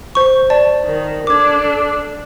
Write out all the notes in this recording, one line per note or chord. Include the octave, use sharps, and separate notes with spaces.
C5 C#6
D5 A5
D#3
D4 A4 D6 G#6